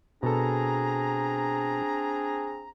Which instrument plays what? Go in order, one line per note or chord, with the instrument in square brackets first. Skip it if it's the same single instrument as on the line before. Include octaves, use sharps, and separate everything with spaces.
[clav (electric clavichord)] B2 A4 [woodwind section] C4 D4 A#5 [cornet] G#4